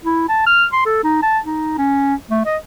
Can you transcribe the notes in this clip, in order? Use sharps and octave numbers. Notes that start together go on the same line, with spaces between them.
E4
A5
F6
C6
A4
D#4
A5
D#4
C#4
A3
D#5